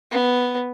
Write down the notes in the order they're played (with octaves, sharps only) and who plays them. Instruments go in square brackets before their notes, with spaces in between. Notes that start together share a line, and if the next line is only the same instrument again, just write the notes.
[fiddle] B3